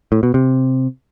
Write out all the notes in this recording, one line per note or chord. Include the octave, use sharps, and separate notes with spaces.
A2
B2
C3